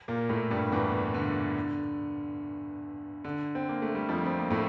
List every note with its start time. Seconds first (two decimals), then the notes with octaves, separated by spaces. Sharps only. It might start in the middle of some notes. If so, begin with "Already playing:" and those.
0.08 A#2 A#3
0.29 A2 A3
0.50 G2 G3
0.72 E2 E3
1.14 D3
3.25 D3
3.55 C4
3.69 A#3
3.82 A3
3.95 G3
4.09 F2 F3
4.26 C4
4.39 A#3
4.50 A2 A3